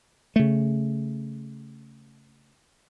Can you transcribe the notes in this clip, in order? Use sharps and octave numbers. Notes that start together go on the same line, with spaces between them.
C#3 A3